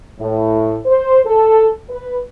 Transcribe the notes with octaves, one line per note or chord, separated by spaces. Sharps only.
A2
C5
A4
B4